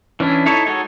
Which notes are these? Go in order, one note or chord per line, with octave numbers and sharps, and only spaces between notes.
E3 C#4 D4 E4
D#4 E4 A4 C#5
G#3 D#4 F#4 A4 C#5